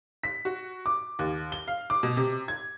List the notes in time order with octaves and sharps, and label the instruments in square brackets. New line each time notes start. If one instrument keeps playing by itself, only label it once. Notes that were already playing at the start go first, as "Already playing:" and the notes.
[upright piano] B6
F#4
D6
D#2
G7
F5
D6
B2
C3
G#6